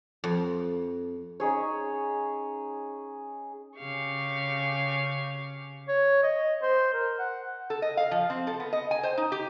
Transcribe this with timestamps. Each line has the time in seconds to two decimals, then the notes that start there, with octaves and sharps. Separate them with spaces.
0.24 F2
1.40 C#4 D#4 G#4 C#5
3.77 C#3 G4 F5 C#6
5.88 C#5
6.23 D#5
6.62 C5
6.94 A#4
7.19 F#5
7.70 A4
7.82 D#5
7.97 F5
8.11 F3
8.30 C4
8.47 A4
8.60 B3
8.73 D#5
8.91 G#5
9.03 C5
9.18 D#4
9.32 G4